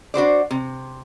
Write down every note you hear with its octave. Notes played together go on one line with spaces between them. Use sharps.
D4 F#4 C5 D5
C3